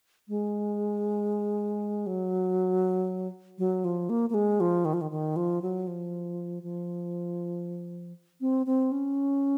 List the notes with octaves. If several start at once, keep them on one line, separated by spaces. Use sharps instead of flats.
G#3
F#3
F#3
F3
A#3
A#3
G#3
F3
D#3
F3
D#3
D#3
F3
F#3
F3
F3
C4
C4
C#4